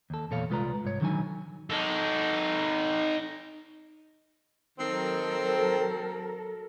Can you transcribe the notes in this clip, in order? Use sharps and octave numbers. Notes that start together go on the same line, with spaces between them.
D#2 A4
E2 A#2 A4 C#5 F5
C2 G#3 F4 B4 D5 A#5
C2 G#2 C#5
D3 D#3 F#3 C4 D#4 G#5
D#4 A4
D#3 F#3 C4 A4 A#4